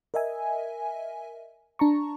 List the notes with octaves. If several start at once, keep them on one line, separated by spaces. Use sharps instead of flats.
A#4 D#5 E5 G#5
D4 A5 A#5 C#6